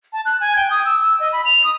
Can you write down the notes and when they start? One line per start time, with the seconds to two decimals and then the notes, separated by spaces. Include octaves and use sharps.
0.13 A5
0.26 F#6
0.40 G#5
0.56 G5
0.71 D#6
0.85 E6
1.01 E6
1.20 D#5
1.32 B5
1.45 F7
1.64 D#6